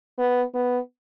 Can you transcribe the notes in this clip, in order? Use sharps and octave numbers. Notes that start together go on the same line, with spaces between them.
B3
B3